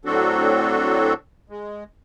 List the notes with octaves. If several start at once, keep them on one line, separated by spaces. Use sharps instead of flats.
A2 F#3 C4 D4 F#4 A4
G#3